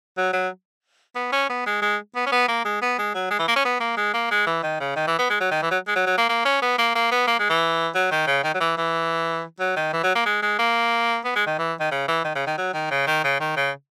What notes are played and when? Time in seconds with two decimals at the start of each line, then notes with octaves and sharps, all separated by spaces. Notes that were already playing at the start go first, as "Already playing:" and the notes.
0.17 F#3
0.33 F#3
1.16 B3
1.32 C#4
1.50 B3
1.66 G#3
1.82 G#3
2.15 B3
2.26 C#4
2.32 B3
2.48 A#3
2.65 G#3
2.82 B3
2.98 G#3
3.14 F#3
3.30 G#3
3.39 E3
3.48 A#3
3.56 C#4
3.65 B3
3.80 A#3
3.97 G#3
4.14 A#3
4.31 G#3
4.47 E3
4.63 D#3
4.80 C#3
4.96 D#3
5.07 E3
5.19 B3
5.30 G#3
5.40 F#3
5.51 D#3
5.62 E3
5.71 F#3
5.87 G#3
5.96 F#3
6.06 F#3
6.18 A#3
6.29 A#3
6.45 C#4
6.62 B3
6.79 A#3
6.95 A#3
7.11 B3
7.27 A#3
7.39 G#3
7.50 E3
7.95 F#3
8.11 D#3
8.27 C#3
8.44 D#3
8.54 F#3
8.60 E3
8.77 E3
9.60 F#3
9.76 D#3
9.93 E3
10.04 F#3
10.15 A#3
10.25 G#3
10.42 G#3
10.59 A#3
11.25 B3
11.36 G#3
11.47 D#3
11.58 E3
11.80 D#3
11.91 C#3
12.08 E3
12.24 D#3
12.35 C#3
12.47 D#3
12.58 F#3
12.74 D#3
12.91 C#3
13.07 D#3
13.24 C#3
13.40 D#3
13.57 C#3